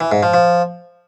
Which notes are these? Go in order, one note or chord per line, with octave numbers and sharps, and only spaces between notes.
E3
G#2
F3
F3